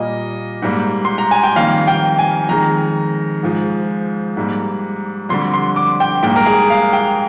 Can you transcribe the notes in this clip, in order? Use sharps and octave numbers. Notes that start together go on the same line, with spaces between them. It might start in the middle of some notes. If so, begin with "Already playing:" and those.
Already playing: A#2 G3 A#3 D#5
G#2 G3 A#3
C6
A#5
G#5
G5
F2 D#3 G3 A#3 F5
G5
G#5
F2 D#3 G#3 A#5
G#2 F3 G#3
G#2 G3 A#3
F2 D3 G3 C6
C6
D6
G5
G#2 G3 A#3 G5
A#4
G#4
F5
G5